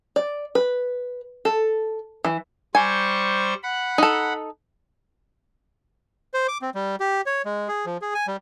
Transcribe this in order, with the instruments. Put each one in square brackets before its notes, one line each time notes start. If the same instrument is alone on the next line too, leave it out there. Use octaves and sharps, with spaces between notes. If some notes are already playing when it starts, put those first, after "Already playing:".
[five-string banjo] D5
B4
A4
E3
[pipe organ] G3 C5 C#6 [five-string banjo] G#5
[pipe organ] F#5 B5
[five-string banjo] D#4 A4
[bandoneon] C5
D6
C4
G3
G4
C#5
G#3
G#4
F3
G#4
G#5
G3